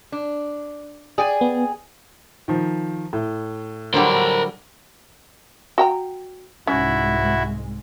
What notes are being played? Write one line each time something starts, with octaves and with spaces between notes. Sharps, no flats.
D4
G#4 D5 G5 G#5
B3
D#3 F3
A2
D3 F#3 G3 A#4 C5
F#4 G5 A#5
C2 G#2 G#3 C#4 E4 F#4 E5